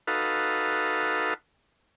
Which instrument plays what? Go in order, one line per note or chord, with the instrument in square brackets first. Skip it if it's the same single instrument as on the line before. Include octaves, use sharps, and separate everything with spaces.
[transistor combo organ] D#4 F#4 A4 B4 F5